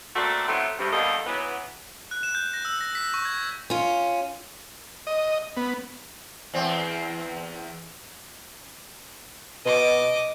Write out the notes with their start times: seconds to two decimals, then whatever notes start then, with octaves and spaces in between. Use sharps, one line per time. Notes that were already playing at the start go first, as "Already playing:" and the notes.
0.15 A3 A#3 C4 D4 F#4 A4
0.47 A2 F#3 A3 B3 C4
0.79 G2 C3
0.92 G2 B2 D3 G3 A#3 D#5
1.26 C#3 E3 F#3 B3
2.11 F#6
2.23 E7
2.35 G6
2.53 A#6
2.65 E6
2.81 A#6
2.95 B6
3.14 C#6
3.25 G#6
3.38 A#6
3.70 C#4 F4
5.07 D#5
5.57 B3
6.54 E2 C4
9.65 B2 D#5 D6